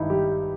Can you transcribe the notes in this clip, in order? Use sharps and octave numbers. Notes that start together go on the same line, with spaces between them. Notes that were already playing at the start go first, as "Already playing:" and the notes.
Already playing: G#1 G2 D#3 D#4 E4
G3 G4